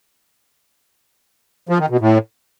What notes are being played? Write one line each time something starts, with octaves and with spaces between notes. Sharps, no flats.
F3
D#3
B2
A2